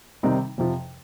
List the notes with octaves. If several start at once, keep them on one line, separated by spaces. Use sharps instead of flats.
C3 D#3 G3 C4 D#4
F2 C3 F3